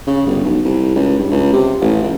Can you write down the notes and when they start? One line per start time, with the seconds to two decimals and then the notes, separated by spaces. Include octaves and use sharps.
0.07 C#3
0.26 G1
0.45 B1
0.65 C2
0.96 C#2
1.18 G2
1.31 C#2
1.53 C3
1.81 A1
2.03 C#2